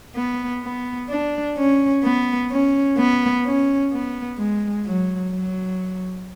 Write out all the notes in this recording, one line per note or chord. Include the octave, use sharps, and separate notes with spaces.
B3
B3
D4
C#4
B3
C#4
B3
C#4
B3
G#3
F#3
F#3